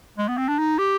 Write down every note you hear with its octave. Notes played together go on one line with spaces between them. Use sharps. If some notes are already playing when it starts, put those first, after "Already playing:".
G#3
B3
C4
D4
D#4
G4